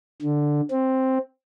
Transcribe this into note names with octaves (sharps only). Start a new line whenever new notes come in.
D3
C4